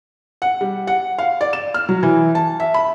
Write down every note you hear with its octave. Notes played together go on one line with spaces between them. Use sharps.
F#5
G3
F#5
F5
D5
E7
F6
F#3
E3
A5
E5
B5